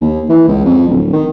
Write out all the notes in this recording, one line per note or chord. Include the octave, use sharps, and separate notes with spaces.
D#2
E3
C#2
F2
D1
D#3